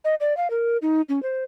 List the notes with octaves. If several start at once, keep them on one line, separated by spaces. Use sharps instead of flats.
D#5
D5
F5
A#4
D#4
C#4
C5